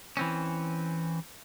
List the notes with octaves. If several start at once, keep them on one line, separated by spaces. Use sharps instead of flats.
E3 C4 C#4